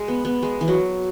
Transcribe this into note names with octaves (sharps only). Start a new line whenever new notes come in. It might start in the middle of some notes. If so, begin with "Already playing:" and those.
Already playing: G#3
B3
B3
G#3
E3
F#3